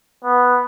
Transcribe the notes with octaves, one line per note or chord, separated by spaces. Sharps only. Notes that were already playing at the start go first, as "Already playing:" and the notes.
B3